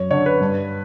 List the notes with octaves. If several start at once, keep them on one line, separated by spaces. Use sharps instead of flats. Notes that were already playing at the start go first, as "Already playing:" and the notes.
Already playing: F#2 C#5
D3 C#5
B4
G2